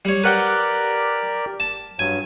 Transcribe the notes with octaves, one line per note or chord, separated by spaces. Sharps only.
G3 C#5
G4 A#4 B4 D5 F#5 G5
A5
G2 F#3 G#5